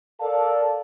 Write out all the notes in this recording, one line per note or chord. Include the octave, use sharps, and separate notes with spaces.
A4 A#4 D5 F5 A5